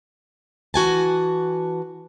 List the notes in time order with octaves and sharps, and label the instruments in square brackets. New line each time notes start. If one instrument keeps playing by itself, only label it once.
[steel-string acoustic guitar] E3 F#4 G#5 A5